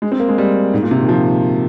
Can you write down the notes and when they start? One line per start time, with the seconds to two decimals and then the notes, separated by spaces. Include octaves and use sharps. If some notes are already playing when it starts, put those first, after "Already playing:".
0.02 G#3
0.12 C4
0.20 A#3
0.28 G#3
0.38 G3
0.74 G#2
0.83 A#2
0.91 C3
1.00 D#3
1.08 F3